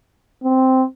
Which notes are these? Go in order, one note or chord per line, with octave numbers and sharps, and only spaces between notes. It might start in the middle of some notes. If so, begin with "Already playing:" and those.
C4